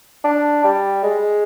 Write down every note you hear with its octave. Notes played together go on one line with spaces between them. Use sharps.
D4
G3
G#3